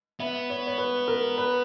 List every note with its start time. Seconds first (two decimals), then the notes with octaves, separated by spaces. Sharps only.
0.20 B3 E5
0.50 C#5
0.67 C#5
0.78 B4
1.08 A#4
1.38 B4